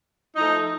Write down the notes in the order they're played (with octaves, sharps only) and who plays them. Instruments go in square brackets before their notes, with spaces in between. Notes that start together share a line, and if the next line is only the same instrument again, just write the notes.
[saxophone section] F3 A3 D#4